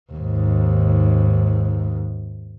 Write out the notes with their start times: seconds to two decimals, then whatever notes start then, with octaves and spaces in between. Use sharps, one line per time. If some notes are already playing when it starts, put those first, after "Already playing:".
0.12 D#2 G#2